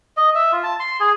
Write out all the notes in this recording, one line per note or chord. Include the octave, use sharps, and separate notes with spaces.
D#5
E5
F4
A5
C6
G#4